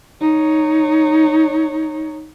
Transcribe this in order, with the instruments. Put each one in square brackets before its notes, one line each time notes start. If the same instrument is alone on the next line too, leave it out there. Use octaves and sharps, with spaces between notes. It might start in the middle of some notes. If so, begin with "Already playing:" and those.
[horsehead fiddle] D#4 C#5